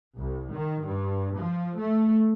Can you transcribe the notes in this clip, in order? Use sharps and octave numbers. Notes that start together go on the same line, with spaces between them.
C2
D#3
G2
F3
A3